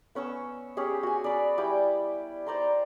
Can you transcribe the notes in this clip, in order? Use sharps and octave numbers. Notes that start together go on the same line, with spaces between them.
B3 C#4 C#6 E6
C#4 G4 G#4
F#4 G#5
D5 B5
G3 E4 G5 D6
C5 D5 A#5 C6